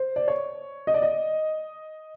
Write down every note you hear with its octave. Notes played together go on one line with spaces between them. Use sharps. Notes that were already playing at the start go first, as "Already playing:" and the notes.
Already playing: C5
D5
C#5
D#5
D5
D#5